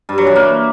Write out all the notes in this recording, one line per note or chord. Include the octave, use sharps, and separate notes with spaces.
G2
F#3
E3
A#3